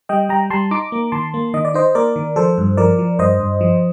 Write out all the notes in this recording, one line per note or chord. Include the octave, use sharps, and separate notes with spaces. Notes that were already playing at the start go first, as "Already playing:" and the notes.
G3 D#5 G5
G3 G5 A#5
G3 A5 C6
D#4 A#5 D6
A#3
D#3 A5 C6
A#3
D#3 D#5
D5
D#4 C5 D#5
A#3 A#4 D5
D#3
F3 A4 C5
G2
F3 A#4 D5
F3
G2 C5 D#5
G2
F3